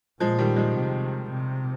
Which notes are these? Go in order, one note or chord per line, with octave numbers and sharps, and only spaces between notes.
A#2 F3 G#3
D#3 G3
F3 G#3
C3
C3